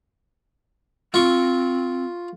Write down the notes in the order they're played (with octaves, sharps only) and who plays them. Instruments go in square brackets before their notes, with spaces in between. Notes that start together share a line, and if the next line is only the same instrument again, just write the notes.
[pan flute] C4 [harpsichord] F4 C#6